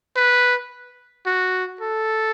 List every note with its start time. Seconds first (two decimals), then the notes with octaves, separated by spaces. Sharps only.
0.16 B4
1.26 F#4
1.81 A4